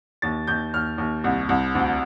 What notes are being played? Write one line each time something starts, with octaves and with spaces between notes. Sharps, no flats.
D#2 A6
D#2 G6
D#2 F6
D#2
C2
C2
D2